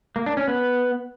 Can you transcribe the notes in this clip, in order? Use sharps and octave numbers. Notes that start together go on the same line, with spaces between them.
A#3
D4
C#4
B3